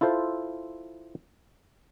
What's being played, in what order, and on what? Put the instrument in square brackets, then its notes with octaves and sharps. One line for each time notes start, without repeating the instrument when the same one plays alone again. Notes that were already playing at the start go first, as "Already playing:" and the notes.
[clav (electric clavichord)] E4 F4 A4 C5